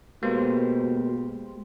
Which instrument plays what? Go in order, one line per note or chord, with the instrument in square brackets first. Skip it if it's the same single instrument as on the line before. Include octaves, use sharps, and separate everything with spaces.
[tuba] B2 [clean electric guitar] G#3 G4 C5 [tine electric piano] A#3